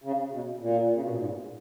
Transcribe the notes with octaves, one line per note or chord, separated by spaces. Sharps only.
C#3
B2
A#2
C#3
B2
A#2
G#2